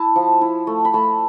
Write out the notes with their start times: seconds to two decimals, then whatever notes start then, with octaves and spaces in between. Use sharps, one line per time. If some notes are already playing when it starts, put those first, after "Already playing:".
Already playing: E4 A5
0.16 F3
0.41 E4
0.67 A3
0.85 B5
0.94 A3 A5